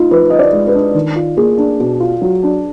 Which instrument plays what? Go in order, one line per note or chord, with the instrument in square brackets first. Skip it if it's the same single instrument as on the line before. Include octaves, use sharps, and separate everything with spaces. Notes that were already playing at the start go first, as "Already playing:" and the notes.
Already playing: [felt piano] D#4 F4
[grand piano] F3 [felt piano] B4
[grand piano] F4 [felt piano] D#5
[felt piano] D5
[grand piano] G#3
[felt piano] B4
[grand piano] D4
D#3
F4
[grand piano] A#3 [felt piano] G#4
[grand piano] D4
B2
F4
F#3
D4